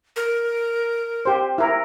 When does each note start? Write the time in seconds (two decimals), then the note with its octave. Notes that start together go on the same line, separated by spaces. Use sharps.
0.16 A#4
1.25 G4 C5
1.58 E4 A#4